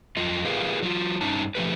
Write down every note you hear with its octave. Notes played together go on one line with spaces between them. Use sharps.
F2 F4 D#5
F4 G4 G#4 A#4 B4 F5
F#3 F4
G2 C#4 D#4 A5
F3 A3 G4 B4